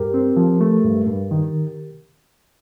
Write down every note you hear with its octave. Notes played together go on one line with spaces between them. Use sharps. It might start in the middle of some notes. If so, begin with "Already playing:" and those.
Already playing: G2 G4 A#4
C4
F3
A3
G2
G2
D#3